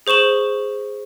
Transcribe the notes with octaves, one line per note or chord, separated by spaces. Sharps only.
G#4 C5 C#6 E7 F#7